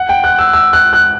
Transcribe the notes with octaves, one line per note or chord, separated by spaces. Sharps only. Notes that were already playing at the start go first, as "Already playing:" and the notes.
Already playing: F#5
G5
F#6
E6
E6
F#6
F#6